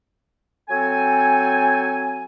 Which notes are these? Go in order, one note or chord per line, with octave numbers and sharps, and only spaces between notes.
F#3 C4 A4 G#5